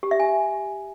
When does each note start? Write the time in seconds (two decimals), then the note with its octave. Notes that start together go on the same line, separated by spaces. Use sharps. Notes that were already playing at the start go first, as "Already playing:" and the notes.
0.03 G4
0.11 E5
0.20 G#5